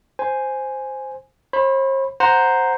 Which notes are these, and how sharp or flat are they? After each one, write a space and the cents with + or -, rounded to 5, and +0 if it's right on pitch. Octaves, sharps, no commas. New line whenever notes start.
C5 +0 G#5 +0
C5 +45 B5 +0
C5 +0 F#5 +0 A#5 +0